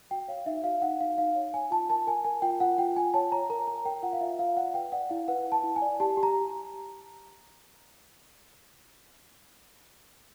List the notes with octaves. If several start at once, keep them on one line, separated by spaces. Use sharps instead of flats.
F#4 G5
C#5 F5
D#4 E5
F#4 F5
D#4 F#5
D#4 F5
D#4 F5
C#5
C#5 G#5
F4 A5
A#4 A5
A#4 G#5
A#4 G#5
F4 G5
F4 F#5
F4 G5
F4 G#5
C#5 A5
C#5 A#5
A#4 A#5
A#4 A#5
A#4 G5
F4 F#5
F5
F4 E5
F4 F5
D5 F#5
B4 G5
D5 F#5
E4 F5
B4 F#5
B4
A5
E4
G#5
D5
G4 A5
G4
A#5